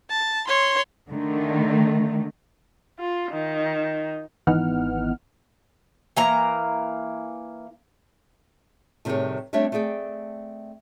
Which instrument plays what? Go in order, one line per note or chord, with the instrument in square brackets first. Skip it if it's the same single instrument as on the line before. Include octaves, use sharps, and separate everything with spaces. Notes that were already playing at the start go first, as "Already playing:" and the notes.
[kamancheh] A5
C#5 C6
[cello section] D3 D#3 A3
[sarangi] F4
D#3
[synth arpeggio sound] G#1 E3 B3 D#4 F#5 F6
[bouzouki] E3 A#3 A#5
[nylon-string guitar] A2 C3 D#3 G3 G#4 C#5
G3 A3 C4 D4 C#5 E5
A3 C4 G#4 D5 G5